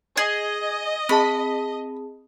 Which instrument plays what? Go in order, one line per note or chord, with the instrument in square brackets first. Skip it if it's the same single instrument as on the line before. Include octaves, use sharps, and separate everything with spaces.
[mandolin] G#4 [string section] D#5
[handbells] C4 G#4 A5 [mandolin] B5